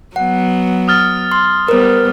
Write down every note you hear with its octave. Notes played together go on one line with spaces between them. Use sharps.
F#3 B3 F#5
D#6 F6 A6
C6
G3 B3 A#4 C5